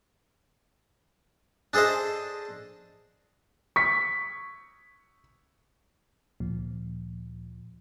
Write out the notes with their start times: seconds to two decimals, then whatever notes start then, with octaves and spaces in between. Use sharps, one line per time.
1.73 D4 G#4 A4 C5 D#5
3.76 C#6 B6
6.40 D2 A#2 F3